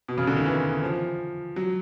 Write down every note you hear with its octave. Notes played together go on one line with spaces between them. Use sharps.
B2
C#3
D3
D#3
E3
F3
F#3